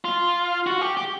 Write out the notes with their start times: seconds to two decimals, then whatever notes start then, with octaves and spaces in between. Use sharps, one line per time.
0.05 F4
0.67 F#4
0.81 G4
0.97 G4